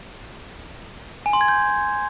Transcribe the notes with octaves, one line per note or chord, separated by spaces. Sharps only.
G#5
C6
G#6
G6